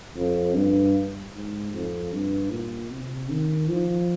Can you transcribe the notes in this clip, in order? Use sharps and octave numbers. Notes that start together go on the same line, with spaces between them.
F2
G2
G#2
F2
G2
A#2
C3
D#3
F3